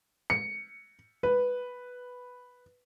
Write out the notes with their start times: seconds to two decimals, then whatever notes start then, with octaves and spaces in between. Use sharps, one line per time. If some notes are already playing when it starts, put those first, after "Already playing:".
0.30 C#7
1.23 B4